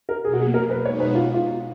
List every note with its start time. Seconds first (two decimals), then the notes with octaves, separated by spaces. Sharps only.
0.09 A#4
0.25 B2 F#3 A#3 G#4
0.33 F#4
0.39 G#4
0.54 A#4
0.70 B4
0.85 B2 G#3 D#4 F#4 C#5
1.00 B4
1.15 F4
1.34 F4